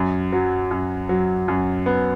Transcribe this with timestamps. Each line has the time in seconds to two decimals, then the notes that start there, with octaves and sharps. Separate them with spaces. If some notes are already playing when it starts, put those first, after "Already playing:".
Already playing: F#2
0.32 F#3
0.71 F#2
1.09 F#3
1.48 F#2
1.86 B3